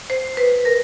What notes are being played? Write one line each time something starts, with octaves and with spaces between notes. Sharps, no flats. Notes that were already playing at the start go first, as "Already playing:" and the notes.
C5
B4
A#4